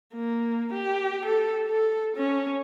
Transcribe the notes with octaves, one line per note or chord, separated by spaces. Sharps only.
A#3
G4
A4
A4
C#4